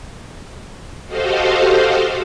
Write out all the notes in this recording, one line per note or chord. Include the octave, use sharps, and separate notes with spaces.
F#4 G4 A4 C5 D#5 F5